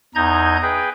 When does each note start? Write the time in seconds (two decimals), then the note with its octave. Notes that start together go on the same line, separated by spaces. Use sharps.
0.15 E2 D#4 D#5 A#5 G6 G#6
0.62 G#4 B4 G5